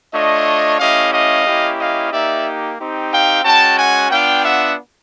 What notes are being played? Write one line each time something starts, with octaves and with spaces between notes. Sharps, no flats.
A3 D4 F4 C#5 D#5
A3 C#4 E4 G4 D#5 F5
D#5 F5
A#3 C#4 E4 G4
D#5 F5
A#3 D#4 G4 D5 E5
C4 D#4 G4
F5 G5
G#3 C#4 F#4 G5 A5
F#5 G#5
B3 D4 F4 F5 G5
E5 F#5